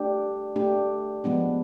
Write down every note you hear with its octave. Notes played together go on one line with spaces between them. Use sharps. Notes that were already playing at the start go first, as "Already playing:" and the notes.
Already playing: A3 D4 G4
A3 D4 G4
F3 G#3 B3 D4